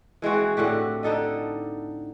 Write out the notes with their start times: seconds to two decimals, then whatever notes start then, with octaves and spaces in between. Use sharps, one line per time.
0.22 E3 G#3 C4 F#4
0.57 A2 D3 F#4 G4
1.03 D3 D#4 A4 D#5